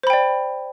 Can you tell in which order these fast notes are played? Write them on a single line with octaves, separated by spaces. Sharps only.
C5 B5 G5 D5